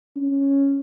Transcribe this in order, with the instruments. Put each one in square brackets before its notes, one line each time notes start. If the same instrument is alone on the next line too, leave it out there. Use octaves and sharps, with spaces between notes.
[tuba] C#4